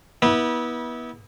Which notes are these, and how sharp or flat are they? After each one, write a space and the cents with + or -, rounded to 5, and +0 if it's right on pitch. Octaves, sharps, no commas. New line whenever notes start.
B3 -25 E4 -35